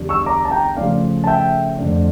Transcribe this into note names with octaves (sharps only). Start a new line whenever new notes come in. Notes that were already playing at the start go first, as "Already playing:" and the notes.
Already playing: E2 D3 G3
C#6 E6
A#5 D6
A5
G5 A#5
C#3 F3 A3 C#4 D5 F5
A5
E5 G5
F2 D3 A3 D4